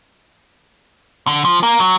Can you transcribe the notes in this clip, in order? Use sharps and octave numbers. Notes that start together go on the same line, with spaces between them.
D3
F3
A#3
F#3